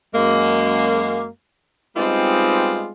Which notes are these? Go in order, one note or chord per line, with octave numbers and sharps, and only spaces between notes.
F#2 G#3 A#3
G3 G#3 B3 C4 D#4 F4